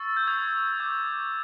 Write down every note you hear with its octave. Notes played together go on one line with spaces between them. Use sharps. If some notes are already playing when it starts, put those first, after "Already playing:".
Already playing: C#6 E6 A6
G6
D#6 G6 G#6
D6 G6